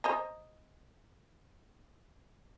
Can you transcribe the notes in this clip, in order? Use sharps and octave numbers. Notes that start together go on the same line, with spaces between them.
C5 D#5 A#5